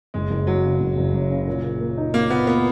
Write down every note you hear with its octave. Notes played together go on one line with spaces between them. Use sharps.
F#1 G#3
F#1
F#2 F#3
C#3
F#1
F#1
F#2
C#3
A#2
A#2
A#3
D#4
A#2 A#3
A#2 B3
A#3 B3